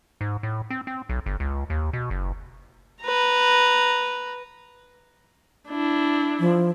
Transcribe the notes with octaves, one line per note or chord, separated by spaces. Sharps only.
G#2
A2
C4
C4
B1
G1
C#2
D#2
B2
F#1
B4 A#5
D4 E4
F3